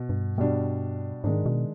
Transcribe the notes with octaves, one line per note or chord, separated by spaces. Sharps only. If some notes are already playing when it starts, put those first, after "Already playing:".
Already playing: B2
G2
B2 G3 D4
G#2 D#3 G#3 D4
B2